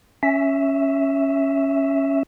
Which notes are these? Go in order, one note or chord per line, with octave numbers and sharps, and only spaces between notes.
C#4 E5